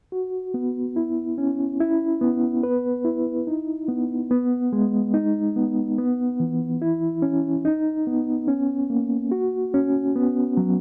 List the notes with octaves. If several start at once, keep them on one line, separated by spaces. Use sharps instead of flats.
F#4
B3
E4
C#4
E4
B3
B4
E4
D#4
B3
B3
G#3
D#4
B3
B3
E3
E4
C#4
D#4
B3
C#4
A#3
F#4
C#4
B3
F#3